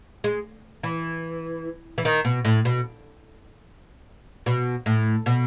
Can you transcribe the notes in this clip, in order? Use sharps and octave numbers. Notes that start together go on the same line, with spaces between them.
G#3
E3
E3
D#3
B2
A2
B2
B2
A2
B2